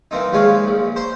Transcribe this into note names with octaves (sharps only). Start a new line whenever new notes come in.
E3 A#3 C4 D#4
D#2 F3 G#3 B4 C#5 F5
A#1
C5 A#5 C6